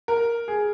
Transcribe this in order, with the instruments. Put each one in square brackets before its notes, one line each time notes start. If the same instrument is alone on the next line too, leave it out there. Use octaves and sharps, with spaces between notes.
[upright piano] A#4
G#4